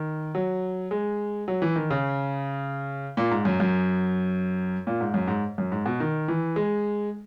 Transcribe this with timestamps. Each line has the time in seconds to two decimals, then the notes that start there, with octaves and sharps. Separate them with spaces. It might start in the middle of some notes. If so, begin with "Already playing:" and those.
Already playing: D#3
0.35 F#3
0.91 G#3
1.48 F#3
1.62 E3
1.76 D#3
1.90 C#3
3.17 A#2
3.31 G#2
3.45 F#2
3.60 F#2
4.87 A#2
5.01 G#2
5.14 F#2
5.27 G#2
5.58 F#2
5.72 G#2
5.86 B2
6.00 D#3
6.28 E3
6.56 G#3